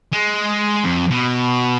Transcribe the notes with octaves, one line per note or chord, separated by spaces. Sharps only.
G#3
F2
B2